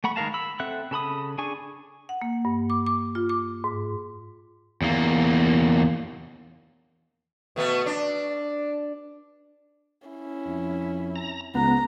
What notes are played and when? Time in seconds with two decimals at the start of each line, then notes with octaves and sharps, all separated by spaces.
0.04 A3 F#5 B5 C#6
0.16 D#3 G#3 A#4 F5 A5
0.34 B5 E6
0.60 C4 A4 E5 F#5 F#6
0.91 C#3 A4 B5 D#6
1.38 D4 G#4 G#5 C#6
2.09 F#5
2.22 A#3
2.45 G2
2.70 D6
2.87 D6
3.15 F4
3.29 D6
3.64 G#2
4.82 E2 A#3
7.56 B2 A3 B3
7.86 D4
10.08 C#4 E4
10.47 F2
11.16 A#5
11.55 C#2 B3 A#5